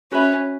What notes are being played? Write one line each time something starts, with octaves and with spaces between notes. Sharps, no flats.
C#4 F#4 B4 E5 B5